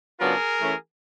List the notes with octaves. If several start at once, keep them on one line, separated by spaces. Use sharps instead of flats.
C#3 F#3 B3 D4 F4 G#4 A#4
E3 A3 C#4